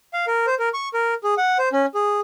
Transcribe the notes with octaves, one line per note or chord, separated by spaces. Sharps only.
F5
A#4
C5
A#4
C#6
A#4
G#4
F#5
C5
C#4
G#4